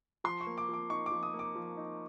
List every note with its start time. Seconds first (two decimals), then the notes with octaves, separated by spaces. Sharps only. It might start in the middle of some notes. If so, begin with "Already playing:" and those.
0.24 F3 C6
0.41 C#6
0.47 A#3
0.58 D6
0.69 F3 D6
0.90 D#4 C#6
1.06 D6
1.11 F3
1.23 D#6
1.34 A#3
1.39 D6
1.55 F3
1.77 D#4